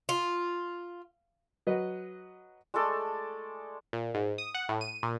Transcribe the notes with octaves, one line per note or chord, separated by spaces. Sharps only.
F4
F#3 B4 D#5
G#3 A3 A4 D5
A#2
G#2
D#6
F#5
A2
D#7
A#2